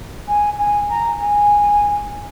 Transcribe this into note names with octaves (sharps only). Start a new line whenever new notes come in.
G#5
G#5
A#5
G#5